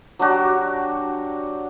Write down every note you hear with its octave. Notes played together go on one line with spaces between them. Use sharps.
F#3 D4 F#4 G4